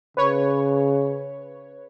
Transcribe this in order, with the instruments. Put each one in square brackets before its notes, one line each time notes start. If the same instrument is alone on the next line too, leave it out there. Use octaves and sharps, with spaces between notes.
[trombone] C#3 [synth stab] B4 C#5